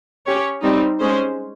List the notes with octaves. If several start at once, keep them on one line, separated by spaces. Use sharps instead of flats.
C#4 G4 C#5
G3 C4 D#4
G#3 C#4 G#4 C5